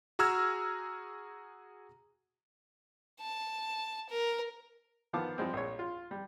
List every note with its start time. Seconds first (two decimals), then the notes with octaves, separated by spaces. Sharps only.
0.19 F#4 G#4 A#5 E6 F6 G#6
3.21 A5
4.09 A#4
5.13 D#3 F3 B3 F5 A5 D6
5.38 F3 G3 G#3 C4
5.53 A#1 C#5
5.79 F4
6.11 G3